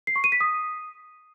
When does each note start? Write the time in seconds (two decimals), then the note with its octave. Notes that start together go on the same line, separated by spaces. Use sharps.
0.07 C7
0.16 C#6
0.24 D#7
0.32 B6
0.40 D#6